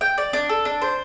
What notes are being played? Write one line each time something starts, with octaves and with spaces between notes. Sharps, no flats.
G5
D5
D4
A4
D4
C5